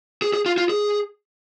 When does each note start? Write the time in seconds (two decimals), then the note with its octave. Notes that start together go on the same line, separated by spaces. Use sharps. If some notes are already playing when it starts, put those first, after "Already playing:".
0.22 G#4
0.33 G#4
0.46 F4
0.58 F4
0.69 G#4